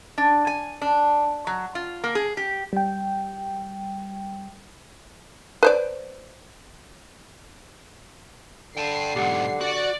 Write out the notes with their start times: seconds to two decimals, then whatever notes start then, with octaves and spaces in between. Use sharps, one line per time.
0.18 D4
0.47 G#5
0.82 D4
1.47 F#3
1.75 F4
2.04 A#3
2.15 G#4
2.37 G4
2.73 G3 G5
5.63 B4 C5 D5
8.77 D3 G5 A5 C7
9.16 B1 G#2 G4 F#5
9.61 F#4 D5